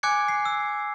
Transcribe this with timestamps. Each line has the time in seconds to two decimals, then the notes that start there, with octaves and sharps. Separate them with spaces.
0.03 G#5 D6 F#6 G#6 C#7
0.28 C7
0.45 E6